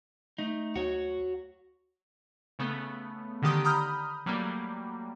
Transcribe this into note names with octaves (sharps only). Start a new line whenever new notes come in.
A3 D#4
D2 F#4 C#5
C#3 A3 B3
D3 D#3 G4 D#6
A#5 B5 D#6 F6 G6
F#3 G3 A3 A#3